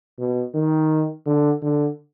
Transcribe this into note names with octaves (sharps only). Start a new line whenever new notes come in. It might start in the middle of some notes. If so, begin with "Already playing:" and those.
B2
D#3
D3
D3